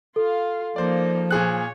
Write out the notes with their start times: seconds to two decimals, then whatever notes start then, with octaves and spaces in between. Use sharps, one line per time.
0.16 F4 A4 F5
0.76 F3 A#3 D#4 C5 D5
1.31 A#2 G#4 C#5 F#6